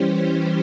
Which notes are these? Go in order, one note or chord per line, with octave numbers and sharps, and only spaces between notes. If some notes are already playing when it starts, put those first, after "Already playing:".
Already playing: E3 G3 C#4 G4 C5